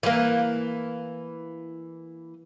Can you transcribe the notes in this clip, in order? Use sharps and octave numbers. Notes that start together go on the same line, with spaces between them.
E3 A#3